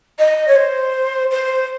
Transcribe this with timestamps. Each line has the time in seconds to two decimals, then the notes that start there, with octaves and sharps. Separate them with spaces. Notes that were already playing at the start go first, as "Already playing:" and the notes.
0.19 D#5
0.47 C#5
0.56 C5
1.31 C5